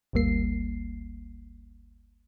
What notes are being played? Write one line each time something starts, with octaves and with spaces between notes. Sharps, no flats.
G1 D2 G3 A#3 C7